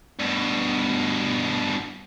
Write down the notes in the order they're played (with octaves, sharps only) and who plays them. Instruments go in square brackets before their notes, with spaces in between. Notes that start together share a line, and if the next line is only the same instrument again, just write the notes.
[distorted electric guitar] G2 B2